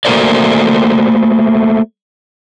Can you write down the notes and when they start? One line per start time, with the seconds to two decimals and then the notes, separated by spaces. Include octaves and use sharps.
0.05 A3 A#3 F#4 A#4 C5 D5